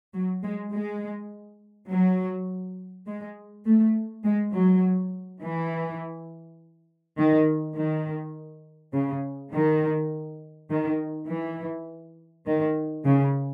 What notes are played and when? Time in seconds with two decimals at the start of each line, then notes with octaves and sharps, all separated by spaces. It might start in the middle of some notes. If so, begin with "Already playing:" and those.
0.14 F#3
0.44 G#3
0.72 G#3
1.90 F#3
3.07 G#3
3.66 A3
4.25 G#3
4.54 F#3
5.42 E3
7.18 D#3
7.76 D#3
8.94 C#3
9.53 D#3
10.70 D#3
11.28 E3
12.46 D#3
13.05 C#3